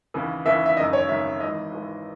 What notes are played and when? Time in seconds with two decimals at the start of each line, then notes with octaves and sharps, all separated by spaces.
0.14 D#2 C#3 E3
0.46 D#2 C#3 E3 E5
0.66 E5
0.77 G#1 F#2 C#3 D#5
0.93 C#5
1.08 G#1 F#2 C#3 E5
1.40 G#1 G#2 E3 D#5
1.72 G#1 G#2 E3